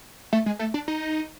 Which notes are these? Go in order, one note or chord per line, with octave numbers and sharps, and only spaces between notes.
A3
G#3
A3
D4
D#4